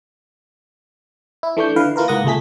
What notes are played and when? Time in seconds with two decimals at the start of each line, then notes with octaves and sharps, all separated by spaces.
1.43 E4
1.57 E3 A3 D4 C#6 G6
1.76 D3 E3 B4 F5
1.96 E3 A#3 F4 A#4 B4
2.08 C#2 G#2 A#3 F#5 D#6 A#6
2.25 C#2 A#2 A3 G#4 B6